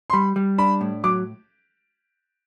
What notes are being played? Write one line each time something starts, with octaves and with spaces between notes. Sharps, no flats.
C6
G3 B5
G3
D4 B5
A2
F#3 D6